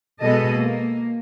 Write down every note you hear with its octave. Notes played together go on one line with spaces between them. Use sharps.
B2 G#3 B3 A4 D#5
A#3